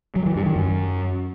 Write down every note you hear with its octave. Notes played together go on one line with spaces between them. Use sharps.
F#3
E3
G2
D#3
F#2